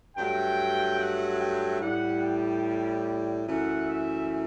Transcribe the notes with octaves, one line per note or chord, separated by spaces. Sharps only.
G2 F#3 A3 G5
F#5
G5
A2 G3 F#5
G5
F#2 E3 A3 F#5
E5